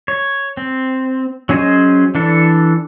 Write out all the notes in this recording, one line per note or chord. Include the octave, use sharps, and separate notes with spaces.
C#5
C4
F#3 C#4 G#4 C5 D#5
E3 D4 A4